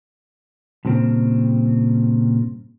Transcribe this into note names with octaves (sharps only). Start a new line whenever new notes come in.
G2 A#2 C#3 C4